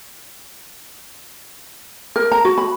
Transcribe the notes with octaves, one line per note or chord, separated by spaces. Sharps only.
A#4
A#5
F#4
B5